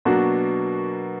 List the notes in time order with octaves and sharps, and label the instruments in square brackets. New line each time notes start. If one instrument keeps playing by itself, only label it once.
[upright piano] B2 F#3 A#3 D4 F#4